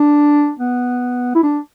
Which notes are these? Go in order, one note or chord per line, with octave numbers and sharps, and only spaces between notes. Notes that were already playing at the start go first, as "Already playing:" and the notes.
Already playing: D4
B3
E4
D4